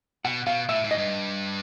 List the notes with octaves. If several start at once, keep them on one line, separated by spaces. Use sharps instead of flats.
B2 F#5
B2 F5
A2 E5
G#2
D#5
G2